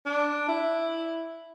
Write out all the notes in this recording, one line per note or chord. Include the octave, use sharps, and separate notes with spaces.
D4
E4